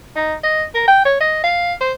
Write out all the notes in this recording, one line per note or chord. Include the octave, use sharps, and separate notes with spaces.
D#4
D#5
A#4
G5
C#5
D#5
F5
C5